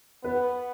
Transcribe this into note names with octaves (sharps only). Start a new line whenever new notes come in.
B3 B4